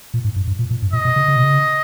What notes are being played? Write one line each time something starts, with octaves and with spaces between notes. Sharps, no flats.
A#2
G#2
G2
G2
A#2
A#2
G2
A#2 D#5
B2
C#3
C#3
B2
C#3